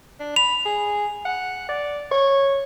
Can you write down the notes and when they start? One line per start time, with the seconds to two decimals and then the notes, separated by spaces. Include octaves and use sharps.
0.20 D4
0.36 B5 F7
0.66 G#4
1.26 F#5
1.69 D5
2.12 C#5